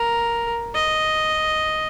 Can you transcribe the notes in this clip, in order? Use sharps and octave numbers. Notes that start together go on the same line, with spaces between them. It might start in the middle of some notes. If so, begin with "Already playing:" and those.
Already playing: A#4
D#5